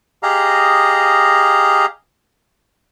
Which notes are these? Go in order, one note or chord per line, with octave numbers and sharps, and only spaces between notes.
G4 G#4 D#5 F5 A#5